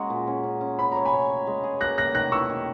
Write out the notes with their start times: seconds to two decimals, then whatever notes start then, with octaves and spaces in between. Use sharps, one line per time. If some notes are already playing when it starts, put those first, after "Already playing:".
Already playing: G#3 A#3 C#4 F#4 A#5 C#6
0.10 A#2
0.27 C#4
0.44 C#4
0.61 C#4
0.79 C#4 B5
0.92 C#5 A#5
1.05 G#5 B5
1.13 C#5
1.30 C#5
1.47 G#3
1.64 G#4
1.81 A#3 F#6 A#6
1.98 A#3 F#6 A#6
2.14 D#3 F#6 A#6
2.32 E4 C#6 E6
2.50 D#3